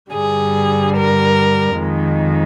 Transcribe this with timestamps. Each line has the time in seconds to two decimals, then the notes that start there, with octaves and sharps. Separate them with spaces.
0.12 G2 D3 G3 G#4
0.96 A#4
1.79 F2 D#3 G#3